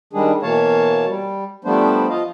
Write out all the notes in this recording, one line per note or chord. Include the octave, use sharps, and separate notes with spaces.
D#3 G3 G#3 D4 G#4
B2 E3 A#3 C#5 F5 A5
G3
F3 G3 A3 B3 D4 C5
F3 F4 D#5 F5